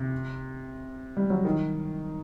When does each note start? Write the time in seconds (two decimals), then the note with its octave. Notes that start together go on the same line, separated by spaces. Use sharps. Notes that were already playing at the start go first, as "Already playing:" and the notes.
Already playing: C3
1.17 G3
1.30 F#3
1.45 D#3